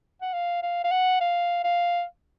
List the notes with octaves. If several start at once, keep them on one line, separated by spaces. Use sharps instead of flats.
F#5
F5
F5
F5
F#5
F5
F5